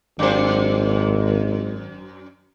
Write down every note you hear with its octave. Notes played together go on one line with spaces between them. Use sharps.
G#1 F#2 C5